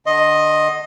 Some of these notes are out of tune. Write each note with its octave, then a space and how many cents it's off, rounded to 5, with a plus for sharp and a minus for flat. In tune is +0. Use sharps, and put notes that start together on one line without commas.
D3 +15 D#5 +0 C6 +30